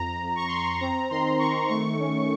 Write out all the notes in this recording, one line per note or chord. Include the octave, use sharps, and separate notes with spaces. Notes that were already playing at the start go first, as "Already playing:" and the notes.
Already playing: F2 A#5
F2
C#6
F2 C6
A#5
C6
C4 A#5
D#3 C6
D#3 C#6
A3 C#6
C#4